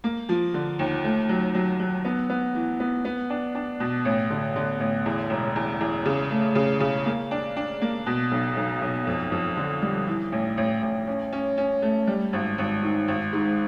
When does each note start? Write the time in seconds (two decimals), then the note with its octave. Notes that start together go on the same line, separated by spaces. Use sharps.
0.04 A#3
0.29 F3
0.54 D3
0.79 D#2
1.04 A3
1.29 F#3
1.55 F#3
1.80 F#3
2.05 B3
2.30 B3
2.55 E3
2.80 B3
3.05 B3
3.30 D4
3.55 D4
3.80 B2
4.05 A1
4.30 D3
4.56 D3
4.80 A1
5.06 E2
5.30 E1
5.56 E2
5.81 E2
6.06 C#3
6.31 A3
6.55 C#3
6.80 C#3
7.06 A#3
7.31 D4
7.57 D4
7.81 A#3
8.06 B2
8.31 B1
8.57 B1
8.81 B1
9.07 F2
9.32 F2
9.57 D3
9.82 G3
10.07 E3
10.32 A1
10.57 A1
10.83 A1
11.07 C#4
11.33 C#4
11.58 C#4
11.82 A3
12.07 G3
12.33 G#1
12.58 G#1
12.83 D#3
13.08 G#1
13.33 G#2